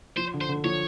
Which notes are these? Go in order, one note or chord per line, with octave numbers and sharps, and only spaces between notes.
F3 C5
D3
C5
D3
F3 C#5